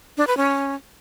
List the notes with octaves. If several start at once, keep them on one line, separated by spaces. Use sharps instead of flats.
D4
B4
C#4